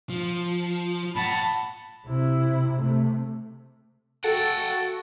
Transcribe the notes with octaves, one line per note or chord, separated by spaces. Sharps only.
F3
A#2 F#5 A5 B5
C3 E4
C3 A3
F#4 A4 F#5 G5 A5